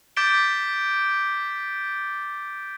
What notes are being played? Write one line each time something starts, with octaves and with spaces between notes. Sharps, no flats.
D6 G6 A6 B6 D7 G7